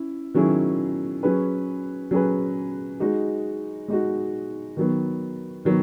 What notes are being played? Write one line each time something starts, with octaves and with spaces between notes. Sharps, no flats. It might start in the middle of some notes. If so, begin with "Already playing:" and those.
Already playing: C#4 E4
D#3 F#3 C#4 E4 G#4
F#3 C#4 G#4 B4
F#3 C#4 G#4 B4
G#3 D#4 F#4
G#3 D#4 F#4
D#3 F#3 B3
D#3 F#3 B3